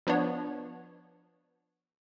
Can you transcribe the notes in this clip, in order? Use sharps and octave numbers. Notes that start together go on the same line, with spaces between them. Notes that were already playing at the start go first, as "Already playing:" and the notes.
F3 B3 D4 C#5